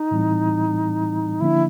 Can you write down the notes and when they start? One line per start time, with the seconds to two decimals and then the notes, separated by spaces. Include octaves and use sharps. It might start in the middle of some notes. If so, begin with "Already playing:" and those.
Already playing: D#4
0.11 A2 E3 G3 C4 E4
1.40 D3 F3 A#3 D4 E4